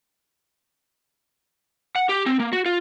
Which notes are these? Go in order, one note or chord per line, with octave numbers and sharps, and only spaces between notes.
F#5
G4
C4
A#3
F#4
F4